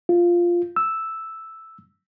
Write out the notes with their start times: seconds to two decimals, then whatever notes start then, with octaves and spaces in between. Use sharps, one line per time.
0.09 F4
0.76 E6